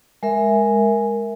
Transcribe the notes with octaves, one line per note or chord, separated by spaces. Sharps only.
G#3 A#4 E5